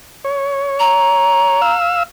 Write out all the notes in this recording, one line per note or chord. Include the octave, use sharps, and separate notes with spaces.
C#5
A#5
F5 E6